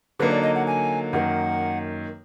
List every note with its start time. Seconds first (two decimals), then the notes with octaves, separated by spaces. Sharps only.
0.20 D3 F#3 A#3 D#4 B4
0.31 D5
0.43 D#5
0.55 F#5
0.67 G#5
1.13 F#2 D#3 A#3 F#5